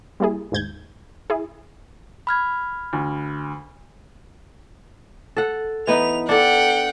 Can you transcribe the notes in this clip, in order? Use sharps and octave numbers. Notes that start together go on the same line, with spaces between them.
G3 A#3 E4 G#4
D#2 G#2 G6 G#6
E4 G#4
B5 F6 G#6
D2
A4 F#5
E3 B3 D#4 F7
D4 A4 F#5 G5